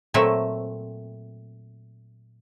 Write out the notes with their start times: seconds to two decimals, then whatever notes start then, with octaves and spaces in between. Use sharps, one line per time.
0.14 A#2 F#3 A3 C4 E5